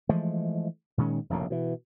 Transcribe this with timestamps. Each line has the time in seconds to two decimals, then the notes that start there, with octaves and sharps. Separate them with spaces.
0.09 E3 F3 G#3 A3
0.98 A#2 D#3 G#3 C#4
1.30 F1 A#1 F#2 C#3
1.50 B2 E3